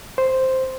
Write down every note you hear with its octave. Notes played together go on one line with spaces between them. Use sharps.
C5